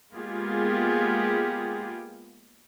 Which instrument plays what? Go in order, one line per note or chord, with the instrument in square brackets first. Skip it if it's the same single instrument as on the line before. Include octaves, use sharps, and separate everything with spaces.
[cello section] G#3 A#3 B3 F4 G4 G#4